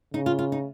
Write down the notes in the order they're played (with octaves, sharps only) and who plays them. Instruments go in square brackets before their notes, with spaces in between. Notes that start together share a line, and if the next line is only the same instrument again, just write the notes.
[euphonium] C#3 [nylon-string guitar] D#4
[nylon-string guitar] F4
F4
D#4